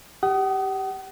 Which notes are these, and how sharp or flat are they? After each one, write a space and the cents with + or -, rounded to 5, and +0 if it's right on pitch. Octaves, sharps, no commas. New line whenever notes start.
G4 +0 F#5 +45 D#6 +0